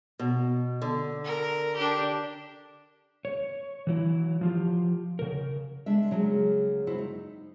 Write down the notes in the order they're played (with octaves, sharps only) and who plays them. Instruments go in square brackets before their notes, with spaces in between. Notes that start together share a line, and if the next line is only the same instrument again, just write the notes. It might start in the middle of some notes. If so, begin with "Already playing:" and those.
[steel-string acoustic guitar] B2
D3
[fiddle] A#4
D4 G4
[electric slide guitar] C#5
E3 F#3 E4
F3 F4 G4
C#3 A#4
[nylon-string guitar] G#3 D4 E5
C#3 F#3 G#3 A#3
E4 F#4 C5
D#4